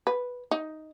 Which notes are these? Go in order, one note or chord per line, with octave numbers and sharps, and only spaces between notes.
B4
D#4